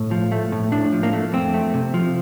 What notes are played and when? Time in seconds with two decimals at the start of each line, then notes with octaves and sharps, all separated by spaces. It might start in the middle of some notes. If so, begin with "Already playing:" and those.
Already playing: A2
0.11 F3
0.32 A3
0.52 A2
0.72 A2 D4
0.93 F3
1.03 A#3
1.13 A3
1.33 F2 C4
1.54 A3
1.74 C3
1.94 F3